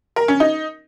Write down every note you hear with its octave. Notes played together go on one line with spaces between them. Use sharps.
A#4
C#4
D#4